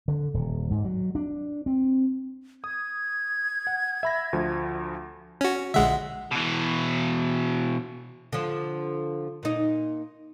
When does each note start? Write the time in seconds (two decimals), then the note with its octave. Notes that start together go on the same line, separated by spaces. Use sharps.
0.08 D3
0.34 D#1
0.71 G#2
0.84 F#3
1.15 D4
1.66 C4
2.64 D#6 G#6
3.67 F#5
4.03 E5 B5 A#6
4.33 D2 F3
5.41 C#4 F#4
5.74 A#1 D3 G#3 E5 F#5
6.32 B2 E3
8.33 D3 F3
9.43 A#2 D#4